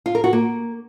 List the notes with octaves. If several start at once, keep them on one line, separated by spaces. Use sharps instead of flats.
F4
A#4
F#4
A#3